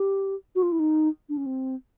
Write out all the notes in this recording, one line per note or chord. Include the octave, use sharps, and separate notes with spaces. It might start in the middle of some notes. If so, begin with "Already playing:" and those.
Already playing: G4
F#4
F4
E4
D#4
D4
C#4
C4